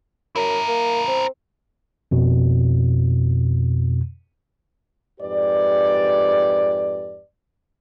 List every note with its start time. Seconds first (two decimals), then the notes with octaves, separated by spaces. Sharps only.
0.36 F#2 E4 A#4
0.68 A#3
1.08 C4
2.11 F2 B2
5.20 F2 G#2 G4 B4 D5